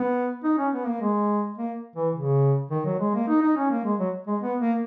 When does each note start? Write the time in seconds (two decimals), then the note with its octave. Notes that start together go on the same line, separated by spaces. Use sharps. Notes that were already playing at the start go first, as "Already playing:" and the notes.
Already playing: B3
0.44 D#4
0.58 C#4
0.73 B3
0.87 A#3
1.02 G#3
1.58 A#3
1.96 E3
2.15 C#3
2.71 D#3
2.86 F#3
2.99 G#3
3.14 A#3
3.28 D#4
3.42 D#4
3.57 C#4
3.71 A#3
3.84 G#3
3.99 F#3
4.27 G#3
4.42 B3
4.60 A#3